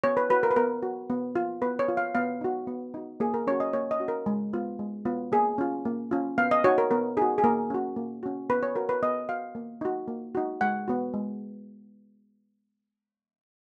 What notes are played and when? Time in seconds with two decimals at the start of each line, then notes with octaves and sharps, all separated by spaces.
0.04 B3 C#5
0.17 B4
0.30 F#4 B4
0.43 A#4
0.51 B4
0.56 B3 A#4
0.83 F#4
1.10 B3
1.36 F4
1.62 B3 B4
1.79 C#5
1.88 F4
1.97 F5
2.15 B3 F5
2.41 D#4 F#4
2.67 B3
2.94 D#4 F#4
3.20 A#3 G#4
3.34 A#4
3.47 C#4 C#5
3.51 F#4
3.60 D#5
3.73 A#3 C#5
3.91 D#5
4.00 C#4 F#4
4.08 A#4
4.26 G#3
4.53 B3 F4
4.79 G#3
5.05 B3 F4
5.32 A#3 G#4
5.58 C#4 F4
5.85 A#3
6.11 C#4 F4
6.38 B3 F5
6.51 D#5
6.64 D#4 F#4 C#5
6.78 A#4
6.91 B3 A#4
7.17 D#4 G#4
7.22 F#4
7.38 G#4
7.44 A#3 A#4
7.70 C#4 F#4
7.96 A#3
8.23 C#4 F#4
8.50 B3 B4
8.63 C#5
8.76 F#4 A#4
8.89 B4
9.03 B3 D#5
9.29 F#4 F5
9.55 A#3
9.81 D#4 F#4
10.08 A#3
10.35 D#4 F#4
10.61 G#3 F#5
10.88 B3 F#4
11.14 G#3